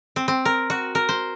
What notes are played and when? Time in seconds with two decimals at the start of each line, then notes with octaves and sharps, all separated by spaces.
0.16 C4
0.28 C4
0.45 A#4
0.70 F#4
0.95 A#4
1.09 C5